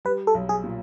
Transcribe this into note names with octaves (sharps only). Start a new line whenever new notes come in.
G3 B4
A4
B1
G#4
A#2